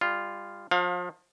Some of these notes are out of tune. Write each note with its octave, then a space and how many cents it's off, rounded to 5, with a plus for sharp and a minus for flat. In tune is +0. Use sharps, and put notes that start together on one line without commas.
G3 +25 F4 -5
F3 +35 F5 +25